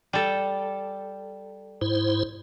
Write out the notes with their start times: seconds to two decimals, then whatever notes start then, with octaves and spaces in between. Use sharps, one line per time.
0.13 G3 A4
1.81 G#2 E4 C5